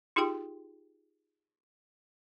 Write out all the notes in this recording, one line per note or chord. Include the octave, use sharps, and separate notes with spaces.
D#4 F4 G4 G#4 G5 C6